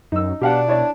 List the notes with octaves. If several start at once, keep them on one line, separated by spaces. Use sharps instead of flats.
F#2 D#4 E6
B2 D4 G4 F5 F#5
E4 C#5 D5